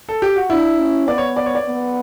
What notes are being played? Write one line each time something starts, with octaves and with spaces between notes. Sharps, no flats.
A4
G4
F#4
D4 E4
C#4
B3 D5
C#5
D5
C#5
D5
B3